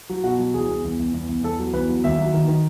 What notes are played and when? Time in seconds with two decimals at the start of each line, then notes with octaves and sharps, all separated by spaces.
0.09 F#3
0.24 B2 F#4
0.38 F#3
0.54 E2 G#4
0.68 E2
0.84 E2
0.99 E2
1.14 E2
1.29 E2
1.43 E2 A4
1.59 F#3
1.73 E2 B4
1.89 F#3
2.04 D#2 E5
2.18 F#3
2.34 D#3
2.48 D#3